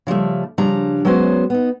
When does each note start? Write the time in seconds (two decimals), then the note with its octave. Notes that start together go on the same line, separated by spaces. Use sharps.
0.07 C#3 F3 G3 A3
0.58 C#3 F3 G3 D4 A#5
1.05 F#3 G#3 B3 C#4 F#4 C5
1.50 B3 D#4